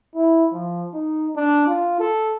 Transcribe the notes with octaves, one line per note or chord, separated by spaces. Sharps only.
E4
F3
D#4
D4
F4
A4